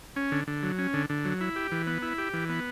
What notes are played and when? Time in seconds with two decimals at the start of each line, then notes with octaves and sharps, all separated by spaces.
0.16 C#4
0.32 D3
0.48 D3
0.63 F#3
0.79 C#4
0.94 D3
1.10 D3
1.25 F#3
1.41 E4
1.56 G4
1.72 E3
1.87 B3
2.02 E4
2.18 G4
2.34 E3
2.49 B3